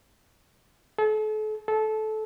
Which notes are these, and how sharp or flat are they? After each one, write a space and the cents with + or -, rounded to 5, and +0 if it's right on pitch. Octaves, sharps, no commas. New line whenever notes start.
A4 -40
A4 -20